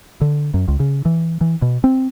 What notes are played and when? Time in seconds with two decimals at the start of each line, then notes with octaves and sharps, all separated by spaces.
0.21 D3
0.54 F#2
0.68 C#2
0.80 C#3
1.05 E3
1.41 E3
1.62 B2
1.84 C4